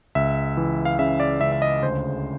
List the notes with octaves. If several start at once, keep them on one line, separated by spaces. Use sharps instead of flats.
C#2 E5
E3
F5
C#3 E5
D5
C#2 E5
E5
D#5
D2 C5